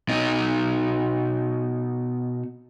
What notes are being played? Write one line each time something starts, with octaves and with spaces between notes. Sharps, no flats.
B2 D#4